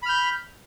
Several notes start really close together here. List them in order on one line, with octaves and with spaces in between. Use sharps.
B5 F6 G6